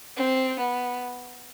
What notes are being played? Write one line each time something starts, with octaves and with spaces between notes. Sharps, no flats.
C4
B3